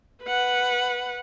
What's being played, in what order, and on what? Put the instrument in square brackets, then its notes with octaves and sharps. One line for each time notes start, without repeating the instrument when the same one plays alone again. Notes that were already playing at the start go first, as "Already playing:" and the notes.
[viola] B4 F#5